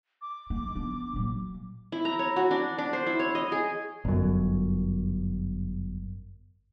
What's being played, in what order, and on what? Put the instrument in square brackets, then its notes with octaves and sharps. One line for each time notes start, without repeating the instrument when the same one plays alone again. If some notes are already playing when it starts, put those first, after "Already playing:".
[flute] D6
[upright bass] G#3
B3 D4
A#2 F#3
[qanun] E4
A#5
C#5
F#4
D4
D4
C5
E4
C#5
D#5
G#4
[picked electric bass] G1 F#2